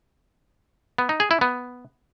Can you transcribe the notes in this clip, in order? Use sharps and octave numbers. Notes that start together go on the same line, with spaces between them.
B3
D#4
G#4
E4
B3